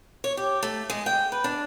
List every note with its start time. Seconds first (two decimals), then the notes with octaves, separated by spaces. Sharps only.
0.24 C#5
0.37 G4
0.63 A3
0.90 G#3
1.06 G5
1.32 B4
1.44 D4